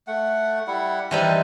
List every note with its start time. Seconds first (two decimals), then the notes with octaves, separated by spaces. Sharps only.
0.07 A3 F#5
0.67 G3 E4 F#5
1.11 E3 G3 C4 D4 D#4